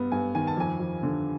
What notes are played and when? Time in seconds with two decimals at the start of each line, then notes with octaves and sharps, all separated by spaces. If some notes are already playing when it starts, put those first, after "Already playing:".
Already playing: G2 B3
0.12 G2 G#5
0.35 D#3 G#5
0.47 A5
0.57 F2 G#5
0.80 F2
1.03 D3